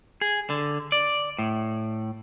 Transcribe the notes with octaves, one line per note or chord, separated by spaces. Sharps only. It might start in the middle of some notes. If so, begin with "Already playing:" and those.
G#4
D3
D5
A2